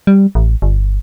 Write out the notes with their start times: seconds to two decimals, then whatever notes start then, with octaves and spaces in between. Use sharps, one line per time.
0.07 G3
0.35 A1
0.62 G1